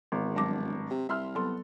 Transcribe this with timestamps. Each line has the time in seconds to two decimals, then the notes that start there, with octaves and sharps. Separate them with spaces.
0.12 G#1 E2
0.35 E1 G2 F#3 A5 D6 A#6
0.91 C3
1.09 C2 E5 C6 F6
1.35 F#3 B3 A4 C6